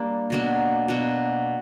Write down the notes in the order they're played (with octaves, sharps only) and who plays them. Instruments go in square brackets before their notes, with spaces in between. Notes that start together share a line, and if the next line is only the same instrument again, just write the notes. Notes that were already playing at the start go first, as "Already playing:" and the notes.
Already playing: [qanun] G3 A#3 D4
B2 F#3 A#3 D4
B2 F#3 A#3 D4